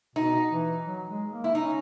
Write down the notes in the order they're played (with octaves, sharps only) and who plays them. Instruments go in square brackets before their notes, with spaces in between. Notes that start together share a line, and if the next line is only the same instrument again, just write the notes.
[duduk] B2 [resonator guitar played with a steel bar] D#4
[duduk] E3
F#3
G#3
A#3
[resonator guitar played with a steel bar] E4
[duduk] C#4 [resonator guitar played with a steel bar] D#4